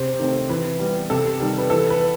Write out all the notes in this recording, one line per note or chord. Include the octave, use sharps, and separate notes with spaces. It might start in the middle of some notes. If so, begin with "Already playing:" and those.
Already playing: C3 C5
D#3 A3 C4
E3 B4
G3 B3
C3 A4
D#3 G3
B4
E3 A4
B4
B3